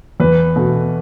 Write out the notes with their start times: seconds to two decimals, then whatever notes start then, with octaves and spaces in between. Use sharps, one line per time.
0.20 E2 B4
0.56 B2 A3